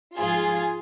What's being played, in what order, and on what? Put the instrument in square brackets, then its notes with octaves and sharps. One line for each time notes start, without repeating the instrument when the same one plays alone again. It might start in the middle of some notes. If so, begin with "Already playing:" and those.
[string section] G#2 F3 F4 G#4